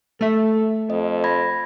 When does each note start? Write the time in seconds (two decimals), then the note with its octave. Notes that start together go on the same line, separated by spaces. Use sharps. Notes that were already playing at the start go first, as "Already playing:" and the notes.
0.21 A3 A4 E5
0.90 F2 D#5
1.24 B5 G#6 A#6